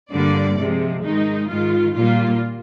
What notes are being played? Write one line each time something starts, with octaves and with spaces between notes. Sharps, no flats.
G2 D3 G3 A#3 D5
C3 F3 G#3
G#2 D#3 G#3 D#4
G#2 D#3 G#3 F4
A#2 G3 A#3 F4